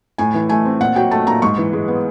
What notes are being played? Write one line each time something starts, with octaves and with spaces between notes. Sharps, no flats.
A2 G#5
E3
A3 G#5
C4
A#2 F#5
F#3 G5
A3 A5
A#2 A#5
G#2 C#6
E3
G#3
B3